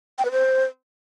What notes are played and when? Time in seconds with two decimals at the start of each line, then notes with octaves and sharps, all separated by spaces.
0.19 G5
0.25 B4
0.32 C5